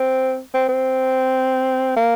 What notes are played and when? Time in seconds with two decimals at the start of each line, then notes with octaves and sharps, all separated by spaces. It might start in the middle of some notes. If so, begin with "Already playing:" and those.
Already playing: C4
0.54 C4
0.68 C4
1.96 A#3